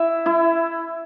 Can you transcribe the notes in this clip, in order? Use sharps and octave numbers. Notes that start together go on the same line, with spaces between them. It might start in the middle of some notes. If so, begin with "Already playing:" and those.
Already playing: E4 E5
E4 E5